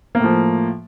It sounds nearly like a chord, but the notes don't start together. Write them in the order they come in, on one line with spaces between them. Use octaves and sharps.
A#3 A2 F3